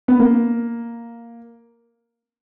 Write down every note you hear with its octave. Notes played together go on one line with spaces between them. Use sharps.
B3
A#3